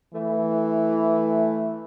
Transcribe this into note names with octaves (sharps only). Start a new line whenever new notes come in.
E3 A3